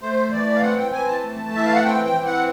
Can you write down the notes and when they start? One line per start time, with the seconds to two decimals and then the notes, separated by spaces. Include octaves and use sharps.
0.01 A3 C5
0.32 E3 D5
0.56 F5
0.62 C4 F#5
0.77 G5
0.92 E3 G#5
1.08 A5
1.23 A3
1.53 E3 E5
1.66 F5
1.75 F#5
1.84 C4 G5
2.04 G5
2.15 E3
2.25 F#5